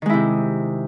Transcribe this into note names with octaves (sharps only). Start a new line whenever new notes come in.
C3 D#3 G#3 E4